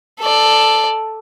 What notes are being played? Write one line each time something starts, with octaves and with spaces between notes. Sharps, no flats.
A4 D5